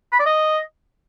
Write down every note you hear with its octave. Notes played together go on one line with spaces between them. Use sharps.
B5
D5
D#5